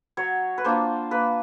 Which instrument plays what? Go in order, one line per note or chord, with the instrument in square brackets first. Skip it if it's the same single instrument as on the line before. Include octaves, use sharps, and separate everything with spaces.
[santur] F#3 C#5
B4
A#3 D4 F4 C5
A#3 B4